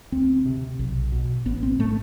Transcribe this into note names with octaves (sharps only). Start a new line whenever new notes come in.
D2 C4
C3
B1
B2
A1 B3
C4
A2 A3